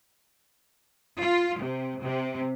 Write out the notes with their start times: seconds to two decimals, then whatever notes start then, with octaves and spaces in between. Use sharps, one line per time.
1.21 F4
1.61 C3
2.03 C3